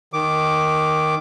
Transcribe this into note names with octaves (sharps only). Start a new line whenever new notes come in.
D#3 D6